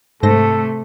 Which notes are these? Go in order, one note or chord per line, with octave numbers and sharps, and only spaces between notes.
G#2 C3 A3 A4 C5 A#6